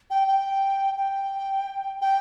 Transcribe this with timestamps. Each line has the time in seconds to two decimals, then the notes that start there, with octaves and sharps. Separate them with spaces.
0.10 G5
0.28 G5
0.97 G5
2.02 G5